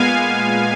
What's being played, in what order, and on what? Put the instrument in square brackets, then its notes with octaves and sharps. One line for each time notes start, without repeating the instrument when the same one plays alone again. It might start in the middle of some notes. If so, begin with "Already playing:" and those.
Already playing: [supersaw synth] A#2 G#3 B3 F5 G#5